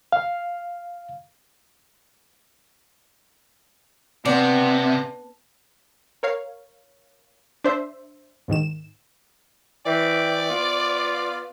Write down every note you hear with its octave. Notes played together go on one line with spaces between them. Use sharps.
F5
C3 B3 D4
A#4 C#5 F5
D4 C5 E5
D#2 G#2 D#3 E7
E3 D5 G5
B3 F4